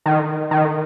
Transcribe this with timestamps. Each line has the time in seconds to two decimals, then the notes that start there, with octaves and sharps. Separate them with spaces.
0.06 D#3
0.51 D#3